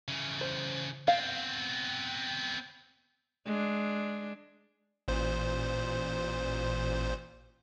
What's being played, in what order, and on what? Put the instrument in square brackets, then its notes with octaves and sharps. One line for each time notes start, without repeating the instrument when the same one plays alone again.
[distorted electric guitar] C#3 E3
[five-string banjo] C5
[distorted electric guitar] B3 C4 [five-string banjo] F5
[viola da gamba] G#3 D4
[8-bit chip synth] A1 A#2 C5